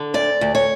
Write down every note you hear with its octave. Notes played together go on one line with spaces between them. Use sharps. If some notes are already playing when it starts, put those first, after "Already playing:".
Already playing: D3
D2 D5
D2
C#5